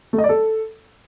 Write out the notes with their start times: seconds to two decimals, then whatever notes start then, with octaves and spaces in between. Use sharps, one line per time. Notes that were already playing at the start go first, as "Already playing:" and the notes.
0.13 A3
0.18 D#5
0.24 D5
0.29 A4